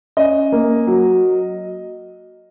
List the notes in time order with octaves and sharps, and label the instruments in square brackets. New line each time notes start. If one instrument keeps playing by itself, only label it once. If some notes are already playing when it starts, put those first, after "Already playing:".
[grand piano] C#4 D#5
A#3
F#3